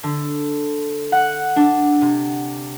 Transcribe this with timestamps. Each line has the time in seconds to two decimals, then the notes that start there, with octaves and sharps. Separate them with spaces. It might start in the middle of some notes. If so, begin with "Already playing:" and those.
0.03 D3
1.12 F#5
1.56 D4
2.01 C3